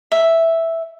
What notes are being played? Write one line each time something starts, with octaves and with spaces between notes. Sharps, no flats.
E5